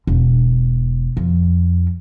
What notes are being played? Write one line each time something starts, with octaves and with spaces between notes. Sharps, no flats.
E1
F2